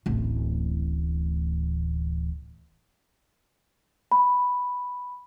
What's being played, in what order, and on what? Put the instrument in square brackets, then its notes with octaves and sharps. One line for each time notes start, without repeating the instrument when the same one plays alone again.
[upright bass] D1 A1
[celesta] B5